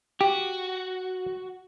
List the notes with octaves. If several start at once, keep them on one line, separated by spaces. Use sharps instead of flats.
F#4 G4